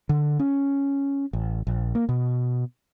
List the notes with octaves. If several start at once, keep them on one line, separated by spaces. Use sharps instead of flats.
D3
C#4
A1
A#1
A#3
B2